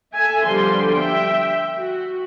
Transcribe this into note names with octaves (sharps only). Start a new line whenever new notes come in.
A4 E5 G#5
D3 F3 G3 B3 C6
E5 G5
F#4